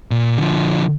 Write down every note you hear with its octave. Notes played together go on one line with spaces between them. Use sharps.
A#2
D3 F3